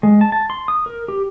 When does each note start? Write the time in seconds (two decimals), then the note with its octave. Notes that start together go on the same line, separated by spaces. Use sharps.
0.03 G#3
0.21 A5
0.32 A5
0.50 C6
0.68 D#6
0.86 A#4
1.08 G4